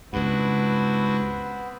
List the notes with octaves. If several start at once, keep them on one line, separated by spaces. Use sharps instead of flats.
C#2 G2 B3 C4 D4 E4 F#4 B4